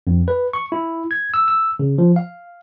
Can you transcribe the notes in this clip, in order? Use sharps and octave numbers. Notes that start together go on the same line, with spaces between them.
F2
B4
C#6
E4
G#6
E6
E6
C#3
F3
F5